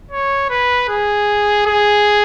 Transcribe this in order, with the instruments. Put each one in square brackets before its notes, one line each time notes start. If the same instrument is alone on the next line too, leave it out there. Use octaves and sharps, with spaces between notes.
[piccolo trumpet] C#5
B4
G#4
G#4